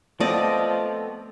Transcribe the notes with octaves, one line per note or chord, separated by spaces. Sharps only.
F3 A3 B3 C4 D5 D#5